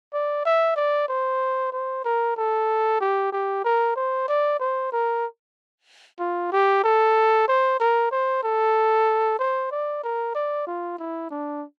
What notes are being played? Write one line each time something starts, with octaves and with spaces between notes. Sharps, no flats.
D5
E5
D5
C5
C5
A#4
A4
G4
G4
A#4
C5
D5
C5
A#4
F4
G4
A4
C5
A#4
C5
A4
C5
D5
A#4
D5
F4
E4
D4